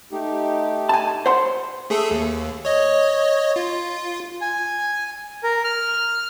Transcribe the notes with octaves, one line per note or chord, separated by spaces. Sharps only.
A3 D#4 G4
G#5 A5
C5 F#5 C6
A3 G#4 A4
D#2
C#5 D#5
F4
G#5
A#4
F6